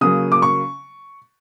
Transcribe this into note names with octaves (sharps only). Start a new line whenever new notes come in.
C#3 F#3 A#3 D#6
D6
C#6